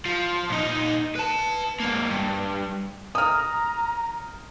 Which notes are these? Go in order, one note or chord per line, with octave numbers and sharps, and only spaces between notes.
F3
A#2 D#4
B4 A5
G#2 A#3
G2
A#5 D#6 F6